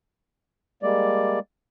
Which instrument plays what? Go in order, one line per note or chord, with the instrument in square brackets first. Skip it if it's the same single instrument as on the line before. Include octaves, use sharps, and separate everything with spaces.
[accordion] G3 G#3 A#3 D5